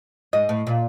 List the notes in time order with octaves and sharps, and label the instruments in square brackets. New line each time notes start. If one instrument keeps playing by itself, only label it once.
[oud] G#2 [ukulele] D#5
[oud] A2
A#2